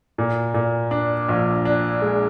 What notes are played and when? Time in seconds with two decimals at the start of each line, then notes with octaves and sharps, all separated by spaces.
0.18 A#2
0.54 A#2
0.91 D4
1.29 A#1
1.65 D4
2.02 G#3